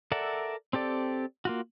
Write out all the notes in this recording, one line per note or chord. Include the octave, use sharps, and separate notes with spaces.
A4 A#4 D5 E5 F#5
C4 G4 A4 D5
A#3 F4 F#4